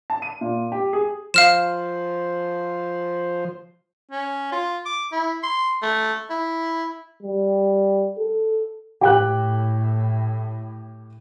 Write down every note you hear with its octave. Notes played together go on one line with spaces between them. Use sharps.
A5
D#7
A#2
G4
G#4
F3 C5 F5 F6 E7
C#4
F4
D6
E4
C6
A3
E4
G3
A4
A2 G4 G5 F#6